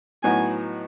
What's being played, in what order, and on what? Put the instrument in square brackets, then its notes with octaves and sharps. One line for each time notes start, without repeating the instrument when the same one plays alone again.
[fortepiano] A2 F#3 B3 D#4 F#4 [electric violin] G#5